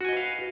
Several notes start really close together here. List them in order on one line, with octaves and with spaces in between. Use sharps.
F#4 G#5 D#5 B4 F5